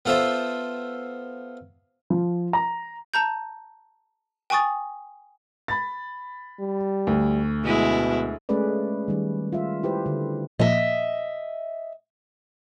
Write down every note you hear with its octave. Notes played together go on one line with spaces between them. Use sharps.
B3 F4 A4 C5 E5
F3
A#5
A5 A#5 G6
G5 G#5 C#6 D#6 A6
B5 A6
G3
D2
B2 G#3 E4
G#3 A3 C#4 G#4 B4 D5
D#3 G3
F4 E5
E4 G4 B4 C5
D3
A#2 F3 A#3 D#5 E5